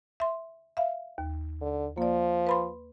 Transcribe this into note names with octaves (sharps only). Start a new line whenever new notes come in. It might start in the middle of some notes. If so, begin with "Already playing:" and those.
E5 C6
E5 F5
D#2
D3
F3 A#3 D5
B4 B5 C6